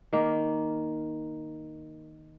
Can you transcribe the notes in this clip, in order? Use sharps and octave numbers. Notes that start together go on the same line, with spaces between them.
D#3 A#3